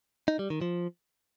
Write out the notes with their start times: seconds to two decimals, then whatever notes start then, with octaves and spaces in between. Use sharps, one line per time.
0.28 D#4
0.39 G3
0.50 D#3
0.61 F3